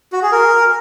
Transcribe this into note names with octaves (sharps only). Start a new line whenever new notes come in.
F#4
G#4
A#4